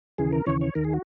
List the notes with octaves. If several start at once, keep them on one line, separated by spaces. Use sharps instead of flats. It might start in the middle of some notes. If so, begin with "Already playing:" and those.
D#2 C#3 E3 G#4
A#4
D#2 C#3 E3 C#5
C#5
D#2 D#3 A#4
G#4
F#4